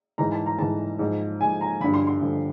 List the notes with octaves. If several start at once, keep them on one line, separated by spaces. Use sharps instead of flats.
G#2 E3 A#5
A5
A#5
G#2 E3 A5
G#2 F3
G#2 F3 G#5
A#5
G2 D3 F3 B5
C6
C6
G2 D3 F3